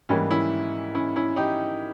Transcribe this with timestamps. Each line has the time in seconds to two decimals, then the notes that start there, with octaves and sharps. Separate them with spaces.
0.09 G#2 E3 G3 A#3 C#4
0.31 C#4 E4
0.95 C#4 E4
1.16 C#4 E4
1.36 D#4 G4